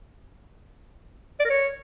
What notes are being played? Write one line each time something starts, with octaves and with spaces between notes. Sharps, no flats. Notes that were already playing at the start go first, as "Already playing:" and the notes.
D5
A#4
C#5